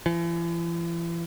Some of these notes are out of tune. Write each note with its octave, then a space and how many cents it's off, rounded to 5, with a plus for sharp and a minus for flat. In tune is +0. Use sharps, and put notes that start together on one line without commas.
E3 +45